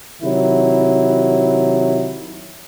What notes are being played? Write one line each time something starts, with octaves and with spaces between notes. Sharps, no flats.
C3 D#3 F#3 E4